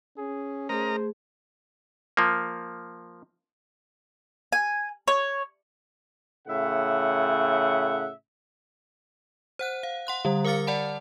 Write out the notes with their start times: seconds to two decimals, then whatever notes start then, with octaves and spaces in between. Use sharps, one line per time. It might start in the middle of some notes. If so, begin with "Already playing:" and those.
0.18 C#4 G#4
0.69 A3 G#4 A#4 C5 D#5 A#5
2.17 F3 A#3
4.53 G#5
5.08 C#5
6.48 A2 C#3 E5 F#5
9.59 C5 F#5 F#6
9.83 F5
10.07 F#5 C6 F#6
10.25 D3 G3
10.45 A#4 F5 D6 F6 A6 C#7
10.67 D5 F#5 A5 B5